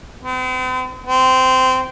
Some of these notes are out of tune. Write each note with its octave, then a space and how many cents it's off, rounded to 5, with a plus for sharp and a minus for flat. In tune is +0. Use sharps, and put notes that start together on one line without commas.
C4 -45
C4 -15